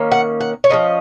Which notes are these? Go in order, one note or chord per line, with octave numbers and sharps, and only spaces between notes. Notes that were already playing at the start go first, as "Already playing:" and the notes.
Already playing: D#3 A#3 C#4
F#5
F#5
C#5
F3 A#3 C#4 D#5